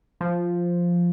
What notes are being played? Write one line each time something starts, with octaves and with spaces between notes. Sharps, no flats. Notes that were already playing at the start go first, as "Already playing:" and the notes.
F3